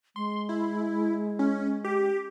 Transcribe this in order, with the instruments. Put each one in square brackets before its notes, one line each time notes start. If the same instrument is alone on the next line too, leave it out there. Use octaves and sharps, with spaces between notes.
[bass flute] G#3 [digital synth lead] C6
[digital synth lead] E4
C#4
G4